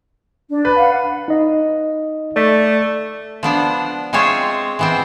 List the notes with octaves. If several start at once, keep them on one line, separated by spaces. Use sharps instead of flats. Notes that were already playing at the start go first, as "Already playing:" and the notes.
D4
B4
F5 F#5
D#4 D#5
A3 D5 B6
F3 B3 D4
G#3 C4 F4 G#4 C#5 E5
E3 B3 C4